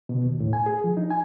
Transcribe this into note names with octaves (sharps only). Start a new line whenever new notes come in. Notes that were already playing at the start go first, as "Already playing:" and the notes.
B2
D#2
A2
G#5
G#4
F3
D#4
G#5